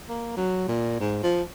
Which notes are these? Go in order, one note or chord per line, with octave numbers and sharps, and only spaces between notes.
A#3
F#3
A#2
G#2
F3